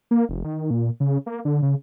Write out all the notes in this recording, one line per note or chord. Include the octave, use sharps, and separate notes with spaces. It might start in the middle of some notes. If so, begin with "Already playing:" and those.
A#3
F1
D#3
A#2
C#3
A#3
D3
C#3